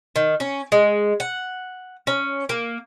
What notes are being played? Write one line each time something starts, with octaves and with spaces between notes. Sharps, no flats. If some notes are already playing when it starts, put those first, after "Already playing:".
D#3
C#4
G#3
F#5
C#4
A#3